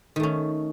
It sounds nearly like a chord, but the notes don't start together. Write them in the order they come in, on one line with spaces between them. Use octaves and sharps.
D#3 A3 C#4